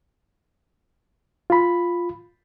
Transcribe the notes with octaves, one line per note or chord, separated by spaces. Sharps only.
F4 B5